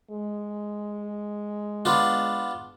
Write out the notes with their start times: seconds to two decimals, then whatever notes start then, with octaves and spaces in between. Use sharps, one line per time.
0.11 G#3
1.85 B3 D4 F4